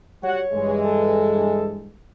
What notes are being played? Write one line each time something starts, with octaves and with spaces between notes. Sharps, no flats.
G3 F#4 C#5 F#5
G2 E3 G#3
A4